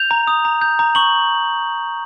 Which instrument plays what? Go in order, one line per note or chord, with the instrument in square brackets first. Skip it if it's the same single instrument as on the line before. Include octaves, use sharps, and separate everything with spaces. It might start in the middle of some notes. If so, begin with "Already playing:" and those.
Already playing: [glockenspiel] G6 F7
A#5
D#6
A#5
G6
A#5
C#6 F#7